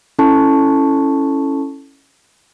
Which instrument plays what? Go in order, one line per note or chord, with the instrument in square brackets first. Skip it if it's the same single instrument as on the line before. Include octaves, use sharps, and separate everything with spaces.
[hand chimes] C#4 E4 A4 A5 C#6